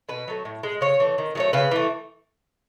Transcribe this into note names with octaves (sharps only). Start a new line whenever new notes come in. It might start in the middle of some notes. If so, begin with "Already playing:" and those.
B2 B4
F#3 A3
A2
G#3
C#3 C#5
E3 A3
D#3
F#3 A3 C#5
C#3 B4
E3 A3